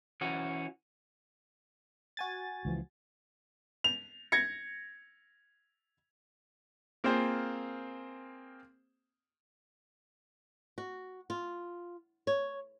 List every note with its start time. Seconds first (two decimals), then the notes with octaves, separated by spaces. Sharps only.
0.21 E3 C#4 F#4
2.17 F#4 G#5 A6
2.65 C#2 E3 F3
3.84 F7
4.32 G#6 A#6 C#7
7.04 A#3 C4 F4 G#4 C5
10.78 F#4
11.30 F4
12.27 C#5